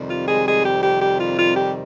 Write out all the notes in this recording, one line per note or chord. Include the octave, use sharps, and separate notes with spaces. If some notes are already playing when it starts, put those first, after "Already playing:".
Already playing: F2 C3 D#3 G3 C4
F4
G#3 G#4
G#3 G#4
G4
G4
G4
F4
F4
G4